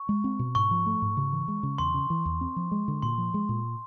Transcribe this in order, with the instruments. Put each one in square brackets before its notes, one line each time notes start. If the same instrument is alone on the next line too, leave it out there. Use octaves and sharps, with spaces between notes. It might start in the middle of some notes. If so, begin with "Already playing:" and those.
Already playing: [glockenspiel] C#6
[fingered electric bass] G#3
C4
B2
[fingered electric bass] G#2 [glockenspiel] C#6
[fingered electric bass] F3
A3
G#2
C#3
E3
G#3
C#3
[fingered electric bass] E2 [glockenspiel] C6
[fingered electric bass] C#3
E3
E2
C4
F3
G#3
D3
[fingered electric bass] A#2 [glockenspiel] C6
[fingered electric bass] F3
G#3
A#2